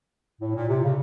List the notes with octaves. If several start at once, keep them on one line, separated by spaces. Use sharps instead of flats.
A2
A#2
C3
C#3